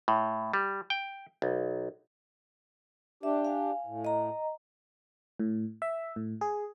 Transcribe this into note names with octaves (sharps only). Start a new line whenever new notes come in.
A2
G3
G5
B1
D4 G4 E5
F5 G#5
A2
D#5 A#5
A2
E5
A2
G#4